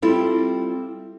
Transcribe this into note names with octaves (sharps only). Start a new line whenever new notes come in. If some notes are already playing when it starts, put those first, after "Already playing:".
G3 C4 E4 F4 A4